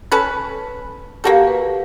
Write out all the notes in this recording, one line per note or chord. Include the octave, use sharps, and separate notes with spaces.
C#4 A4 B4
A#3 F#4 G4 A4 F5
B4